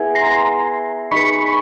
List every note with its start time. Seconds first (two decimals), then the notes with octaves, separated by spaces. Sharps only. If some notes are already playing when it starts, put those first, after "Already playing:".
Already playing: B3 E4 G#4 B4
0.15 A#5 C6
1.11 D#4 G#4 B4 B5 C#6